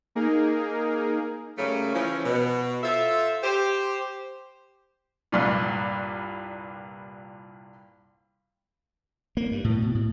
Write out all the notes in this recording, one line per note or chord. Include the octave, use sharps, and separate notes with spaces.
A#3 D#4 G#4 A#4
C#3 F#3 G3 A3 A#3 C#4
E3 F3 C#4
B2
F4 A4 C5 E5
G4 C5
C2 G2 A#2
A#3
G2
A2
B2
A2